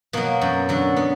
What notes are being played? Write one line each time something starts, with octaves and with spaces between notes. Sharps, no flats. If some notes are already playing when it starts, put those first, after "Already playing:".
B2 F#3 A#3
F#2
D3 F#3
B3